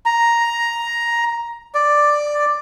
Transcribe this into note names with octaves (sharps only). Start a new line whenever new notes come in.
A#5
D5